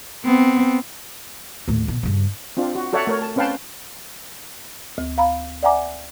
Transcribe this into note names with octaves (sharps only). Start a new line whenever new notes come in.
B3 C4
D#2 A2
B2
G2 C#3
C4 D4 F4
F#4
F#4 A4 C#5 D5 E5 F#5
A3 A#4 C#5
A5
C4 C#4 B4 F5 G5 A5
D2
F5 A#5 B5
D5 E5 F#5 G#5 A#5 D6